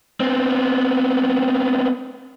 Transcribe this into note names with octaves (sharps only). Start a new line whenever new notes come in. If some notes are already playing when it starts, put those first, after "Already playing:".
B3 C4